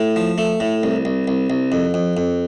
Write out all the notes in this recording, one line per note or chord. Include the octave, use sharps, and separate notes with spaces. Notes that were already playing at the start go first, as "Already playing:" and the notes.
Already playing: A2
F3
A3
A2
C2
C2
C2
C2
F2
F2
F2